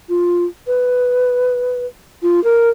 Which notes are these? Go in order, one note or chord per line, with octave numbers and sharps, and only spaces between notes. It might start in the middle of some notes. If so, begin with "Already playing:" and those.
F4
B4
F4
A#4